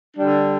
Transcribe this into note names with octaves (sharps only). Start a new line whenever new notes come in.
D3 G3 D4